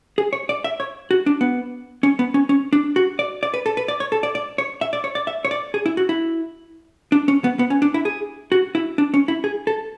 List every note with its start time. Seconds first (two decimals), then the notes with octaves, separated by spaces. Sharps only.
0.18 G#4
0.33 C#5
0.49 D5
0.64 E5
0.80 C#5
1.11 F#4
1.26 D4
1.41 B3
2.03 C#4
2.19 B3
2.34 C#4
2.49 C#4
2.73 D4
2.96 F#4
3.19 D5
3.43 D5
3.54 B4
3.66 A4
3.77 B4
3.88 D5
4.00 C#5
4.12 A4
4.23 D5
4.35 D5
4.58 C#5
4.81 E5
4.93 D5
5.04 C#5
5.15 D5
5.27 E5
5.45 C#5
5.51 D5
5.74 G#4
5.86 E4
5.97 F#4
6.09 E4
7.12 D4
7.28 C#4
7.44 B3
7.59 B3
7.70 C#4
7.82 D4
7.94 E4
8.05 G#4
8.52 F#4
8.75 E4
8.98 D4
9.14 C#4
9.28 E4
9.44 G#4
9.67 A4